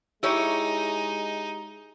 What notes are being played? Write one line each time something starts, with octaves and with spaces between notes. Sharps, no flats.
G#3 D#4 E4 G4 C#5